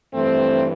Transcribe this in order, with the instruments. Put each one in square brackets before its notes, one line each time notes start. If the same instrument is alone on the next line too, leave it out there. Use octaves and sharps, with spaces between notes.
[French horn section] G2 E3 A3 C4